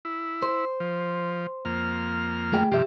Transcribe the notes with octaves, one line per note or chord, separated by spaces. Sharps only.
E4
C5
F3
F2 A#3 F6
A3 G#4 G5
G2 C3 F3 G4 E5